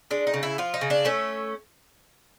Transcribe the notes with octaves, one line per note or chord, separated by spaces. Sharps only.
G#3 D4
D#4
C#3
E4
F3 F4
D#4
C#3
D4
A3 C#4